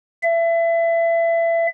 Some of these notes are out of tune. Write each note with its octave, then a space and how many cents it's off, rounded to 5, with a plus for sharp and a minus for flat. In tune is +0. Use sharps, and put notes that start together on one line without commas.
E5 +25